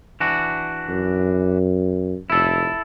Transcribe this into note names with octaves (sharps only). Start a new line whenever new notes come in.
E3 D4 F#4
F#2
F1 E4 A4